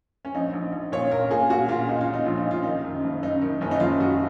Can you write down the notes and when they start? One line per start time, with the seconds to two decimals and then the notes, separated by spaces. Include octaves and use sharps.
0.25 C#4
0.35 A#1 D#4
0.53 A#1
0.72 A#1
0.92 A#2 C#5
1.11 A#2 A#4
1.30 A#2 G#4
1.50 A#2 F#4
1.69 A#2 F4
1.89 A#2 D#4
2.01 F4
2.08 A#2
2.14 D#4
2.25 A#1 F4
2.38 D#4
2.46 A#1 F4
2.63 D#3 D#4
2.85 F#2
3.04 F#1
3.23 F#2 D#4
3.42 D#3
3.61 F#1 C#4
3.71 D#4
3.80 F#1 F4
4.00 F#2 F#4